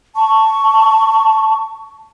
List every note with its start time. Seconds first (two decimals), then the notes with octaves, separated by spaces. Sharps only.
0.16 A5 C#6